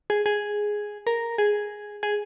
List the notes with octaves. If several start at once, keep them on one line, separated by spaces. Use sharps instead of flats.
G#4
G#4
A#4
G#4
G#4